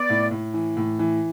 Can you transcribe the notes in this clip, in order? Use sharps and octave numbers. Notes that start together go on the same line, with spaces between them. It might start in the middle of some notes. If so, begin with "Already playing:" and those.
Already playing: B3 D5
A2
A2
E3
A2
E3